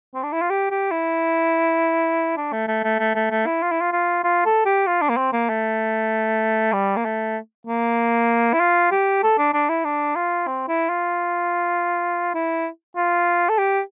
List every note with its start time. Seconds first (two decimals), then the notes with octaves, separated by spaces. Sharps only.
0.15 C4
0.23 D4
0.32 E4
0.41 F4
0.50 G4
0.71 G4
0.91 E4
2.37 D4
2.52 A3
2.68 A3
2.84 A3
2.99 A3
3.15 A3
3.31 A3
3.46 E4
3.62 F4
3.71 E4
3.81 F4
3.92 F4
4.24 F4
4.45 A4
4.65 G4
4.87 F4
5.02 D4
5.09 A#3
5.17 C4
5.33 A#3
5.49 A3
6.73 G3
6.96 A#3
7.05 A3
7.67 A#3
8.53 E4
8.60 F4
8.91 G4
9.23 A4
9.38 D4
9.54 D4
9.69 E4
9.85 D4
10.16 F4
10.47 C4
10.68 E4
10.89 F4
12.34 E4
12.96 F4
13.49 A4
13.58 G4